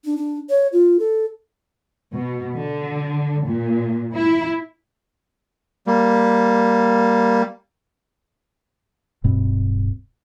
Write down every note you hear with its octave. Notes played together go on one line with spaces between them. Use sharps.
D4
D4
C#5
F4
A4
B2
D3
A#2
E4
G3 A#3
D1 G2 B2 C4